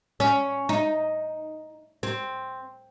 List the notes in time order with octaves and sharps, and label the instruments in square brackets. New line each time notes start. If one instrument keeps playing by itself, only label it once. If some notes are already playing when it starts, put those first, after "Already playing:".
[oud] C#4
D#4
C4